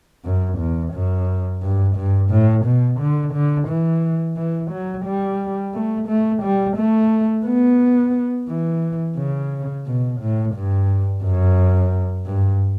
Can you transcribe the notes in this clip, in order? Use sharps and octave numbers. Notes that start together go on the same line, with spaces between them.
F#2
E2
F#2
G2
G2
A2
B2
D3
D3
E3
E3
F#3
G3
A3
A3
G3
A3
B3
E3
C#3
B2
A2
G2
F#2
G2